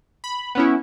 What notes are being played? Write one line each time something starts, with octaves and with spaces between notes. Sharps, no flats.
B5
B3 C#4 E4